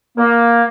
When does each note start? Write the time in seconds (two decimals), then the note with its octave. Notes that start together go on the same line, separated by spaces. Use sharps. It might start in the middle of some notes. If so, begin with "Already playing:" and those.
0.17 A#3